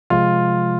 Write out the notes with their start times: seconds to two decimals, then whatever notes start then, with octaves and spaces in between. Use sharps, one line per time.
0.10 C3 F3 G#3 F4